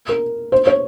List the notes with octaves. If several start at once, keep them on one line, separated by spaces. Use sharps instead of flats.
A#4
C5
C#5